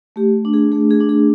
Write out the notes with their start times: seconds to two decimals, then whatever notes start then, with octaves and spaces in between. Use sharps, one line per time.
0.16 A3 G4
0.45 D4
0.53 G#4
0.72 A3 G#4
0.90 G#4
1.00 D4
1.09 G#4